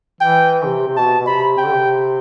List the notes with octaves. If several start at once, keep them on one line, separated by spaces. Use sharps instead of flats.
E3 G5
C3
C3
B2 A5
B2
C3 B5
C3 G5
D3
C3